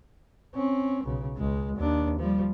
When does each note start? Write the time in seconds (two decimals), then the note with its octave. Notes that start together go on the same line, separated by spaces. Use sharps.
0.55 C4 C#4
1.04 B1 C#3
1.36 C#2 G#3
1.77 D#2 D4
2.19 F3 G3